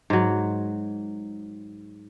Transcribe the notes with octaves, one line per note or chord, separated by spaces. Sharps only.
G#2 F#3